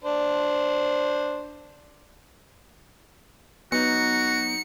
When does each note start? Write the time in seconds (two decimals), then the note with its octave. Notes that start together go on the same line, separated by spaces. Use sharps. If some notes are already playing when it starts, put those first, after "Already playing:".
0.04 D4 C5
3.72 F#3 B3 D#4 F#4 C#7